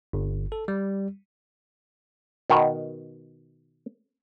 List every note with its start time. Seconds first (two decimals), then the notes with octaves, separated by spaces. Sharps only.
0.13 G1
0.52 A4
0.68 G3
2.50 B2 D#3 B3